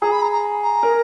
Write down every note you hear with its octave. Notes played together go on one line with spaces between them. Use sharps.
G#4 A#5
B5
A#5
A#5
A#5
A#4